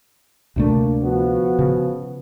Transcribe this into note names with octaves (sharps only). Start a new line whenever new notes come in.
D2 C3 A3 A#3 D4
F3 B3 F#4
C#3